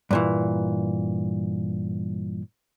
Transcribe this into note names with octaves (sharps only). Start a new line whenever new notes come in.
G2 A#2 E3